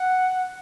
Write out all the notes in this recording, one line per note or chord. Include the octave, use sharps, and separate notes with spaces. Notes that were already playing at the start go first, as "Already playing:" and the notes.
Already playing: F#5